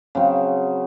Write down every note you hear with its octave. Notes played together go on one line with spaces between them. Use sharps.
C#3 F#3 C4